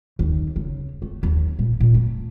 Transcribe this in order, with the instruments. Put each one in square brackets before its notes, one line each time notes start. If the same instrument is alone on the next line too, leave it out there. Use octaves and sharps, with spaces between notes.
[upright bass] D#2
C#3
A3
D#2
A#2
A#2
A3